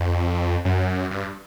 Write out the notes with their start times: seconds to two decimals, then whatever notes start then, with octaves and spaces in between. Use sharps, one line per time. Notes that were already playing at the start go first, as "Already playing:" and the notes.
Already playing: F2
0.65 F#2
1.11 G2